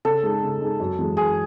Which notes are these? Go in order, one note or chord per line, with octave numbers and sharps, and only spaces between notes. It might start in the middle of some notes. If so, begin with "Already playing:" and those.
C#3 A4
G#3 D#4 G#4
C#3
G#3 D#4 G#4
F#2
E3 G#3
F#2 G#4